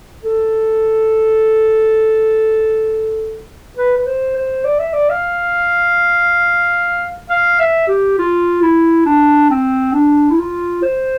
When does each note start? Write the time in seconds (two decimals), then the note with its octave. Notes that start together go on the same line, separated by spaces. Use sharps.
0.24 A4
3.77 B4
3.97 B4
4.06 C5
4.36 C5
4.65 D5
4.79 E5
4.93 D5
5.10 F5
7.30 F5
7.59 E5
7.88 G4
8.18 F4
8.62 E4
9.06 D4
9.50 C4
9.93 D4
10.31 E4
10.38 F4
10.82 C5